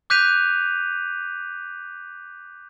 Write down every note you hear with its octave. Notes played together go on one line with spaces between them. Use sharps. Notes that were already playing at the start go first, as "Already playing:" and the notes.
D6 F#6 G6 B6 D#7 F7